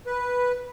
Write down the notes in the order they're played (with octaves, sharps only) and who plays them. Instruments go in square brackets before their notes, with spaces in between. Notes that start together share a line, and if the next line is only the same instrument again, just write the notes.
[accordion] B4